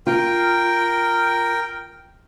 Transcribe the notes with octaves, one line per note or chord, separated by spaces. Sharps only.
F4 A#4 G5